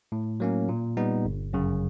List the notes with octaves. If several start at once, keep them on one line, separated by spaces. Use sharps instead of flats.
A2
F#3 A#3 C#4
A#2
G3 B3 D#4
G1
F#2 C#3